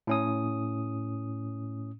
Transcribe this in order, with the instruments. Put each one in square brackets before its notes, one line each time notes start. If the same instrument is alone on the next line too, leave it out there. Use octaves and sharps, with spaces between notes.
[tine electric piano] A2 C#4 D#6